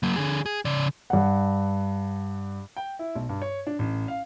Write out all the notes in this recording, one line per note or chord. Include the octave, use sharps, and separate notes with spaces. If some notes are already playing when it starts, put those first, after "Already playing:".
F#3 A#3
D3 G#4
G#4
C#3 D5
G2 F#5
G5
E4
B1
G2
C#5
D4
A1
F5